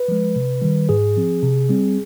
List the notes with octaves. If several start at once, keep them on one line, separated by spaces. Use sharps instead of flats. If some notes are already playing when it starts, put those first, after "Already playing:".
Already playing: B4
F3 G#3
C3
D#3 G3
G#2 G#4
F3 C4
C3
G3 C4